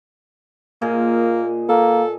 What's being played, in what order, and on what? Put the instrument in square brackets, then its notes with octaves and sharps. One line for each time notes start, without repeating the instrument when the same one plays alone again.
[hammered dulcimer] A#2 G#4 D#5 [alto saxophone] A#3
[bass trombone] A#3 [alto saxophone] A4